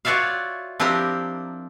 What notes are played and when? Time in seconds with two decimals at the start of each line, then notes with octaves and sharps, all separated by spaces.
0.05 F4 F#4 C#5 D5 E5 F5
0.80 F3 C4 D4 E4 G4 A#4